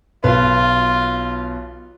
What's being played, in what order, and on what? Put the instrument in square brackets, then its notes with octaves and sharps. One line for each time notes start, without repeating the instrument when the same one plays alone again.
[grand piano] B1 B4 [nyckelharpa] F4